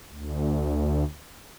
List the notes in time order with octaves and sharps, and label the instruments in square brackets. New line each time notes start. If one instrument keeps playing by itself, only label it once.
[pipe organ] D2